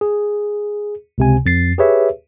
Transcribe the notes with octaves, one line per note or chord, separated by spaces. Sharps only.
G#4
C#2 C3 G#5
F2 A6 C7
G4 G#4 B4 C#5 E5